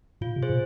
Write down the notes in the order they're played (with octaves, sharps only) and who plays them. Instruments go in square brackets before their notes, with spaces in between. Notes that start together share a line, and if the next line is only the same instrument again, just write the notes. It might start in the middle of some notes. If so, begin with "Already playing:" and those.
[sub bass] A#2 [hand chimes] F4
[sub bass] C3
[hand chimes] G#4 C5
[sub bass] A#2